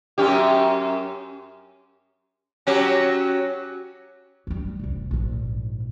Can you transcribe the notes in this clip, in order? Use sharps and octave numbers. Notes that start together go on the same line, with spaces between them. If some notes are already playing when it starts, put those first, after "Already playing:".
F#2 C#4 G4
F#3 C#4 G4
F#3 G3
E1 C2
A#1 G#2